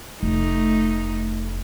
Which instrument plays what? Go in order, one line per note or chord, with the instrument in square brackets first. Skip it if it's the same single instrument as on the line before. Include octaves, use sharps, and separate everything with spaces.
[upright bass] F1 [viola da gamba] A3 D#4